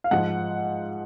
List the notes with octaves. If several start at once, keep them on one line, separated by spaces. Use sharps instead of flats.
F5
G#2 F3 F#5